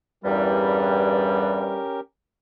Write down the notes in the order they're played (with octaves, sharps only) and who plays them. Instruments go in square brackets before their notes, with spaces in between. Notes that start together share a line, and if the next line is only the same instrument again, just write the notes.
[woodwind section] E2 G2 G3 [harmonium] C#4 G4 A#4